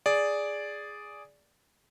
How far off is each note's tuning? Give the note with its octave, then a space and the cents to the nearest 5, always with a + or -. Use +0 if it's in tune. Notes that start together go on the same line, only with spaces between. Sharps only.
G#4 +0 D5 -5